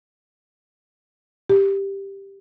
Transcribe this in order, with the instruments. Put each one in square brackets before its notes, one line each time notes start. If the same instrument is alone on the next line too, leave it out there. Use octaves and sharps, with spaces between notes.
[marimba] G4